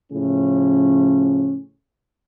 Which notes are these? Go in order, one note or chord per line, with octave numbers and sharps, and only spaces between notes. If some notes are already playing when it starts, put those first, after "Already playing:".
A2 C#3 F3 C#4